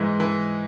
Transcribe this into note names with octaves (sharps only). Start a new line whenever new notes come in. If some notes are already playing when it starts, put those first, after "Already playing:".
Already playing: G#2 E3 G#3 C5
E3